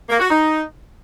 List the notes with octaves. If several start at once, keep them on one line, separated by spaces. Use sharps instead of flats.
A#3
F#4
D#4